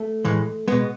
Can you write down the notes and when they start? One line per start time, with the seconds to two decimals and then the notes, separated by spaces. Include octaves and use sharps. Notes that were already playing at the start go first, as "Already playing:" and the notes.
Already playing: A3
0.25 A2 E3 G#3
0.68 B2 G#3 B3